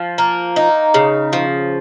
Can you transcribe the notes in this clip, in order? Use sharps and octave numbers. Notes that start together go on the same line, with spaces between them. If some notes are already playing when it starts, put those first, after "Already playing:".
Already playing: F3
A#3
D#4
C#3
F3